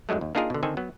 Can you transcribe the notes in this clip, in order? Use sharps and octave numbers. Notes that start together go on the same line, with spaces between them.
G1 D2 F#3 G#3 A3
D#2
A#3 D4 D#4 F4 G#4 A#4
B2 D3
D3 D#3 C4 A4 G#5
F#3 B3